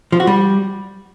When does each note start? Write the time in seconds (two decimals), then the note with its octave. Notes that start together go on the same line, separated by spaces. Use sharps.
0.12 F3
0.20 F#4
0.27 G3